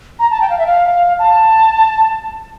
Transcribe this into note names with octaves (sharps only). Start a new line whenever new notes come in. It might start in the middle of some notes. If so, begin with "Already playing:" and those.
A#5
A5
G5
F5
E5
F5
A5